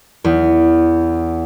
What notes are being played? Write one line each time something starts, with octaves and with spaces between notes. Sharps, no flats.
E2